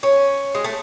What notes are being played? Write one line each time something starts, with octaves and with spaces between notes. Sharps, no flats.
C#4
G#3
A3